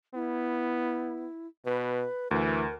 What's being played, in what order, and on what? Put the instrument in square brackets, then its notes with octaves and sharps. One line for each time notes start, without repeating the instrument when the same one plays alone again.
[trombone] B3 [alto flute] E4
[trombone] B2 [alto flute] B4
[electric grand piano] D2 [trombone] E3 [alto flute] A#4